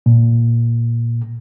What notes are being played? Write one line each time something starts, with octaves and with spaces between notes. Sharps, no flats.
A#2